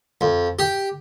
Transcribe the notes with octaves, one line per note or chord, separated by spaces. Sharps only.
F2
G4